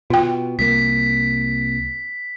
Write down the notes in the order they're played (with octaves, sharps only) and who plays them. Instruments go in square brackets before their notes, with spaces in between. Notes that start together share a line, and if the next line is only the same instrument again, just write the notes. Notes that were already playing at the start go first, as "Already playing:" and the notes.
[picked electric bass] B2 [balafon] F4 G5
[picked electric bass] C2 A#3 [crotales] B6